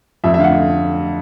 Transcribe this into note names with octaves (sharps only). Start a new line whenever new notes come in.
F2 E5
E5
D3 F5
F#5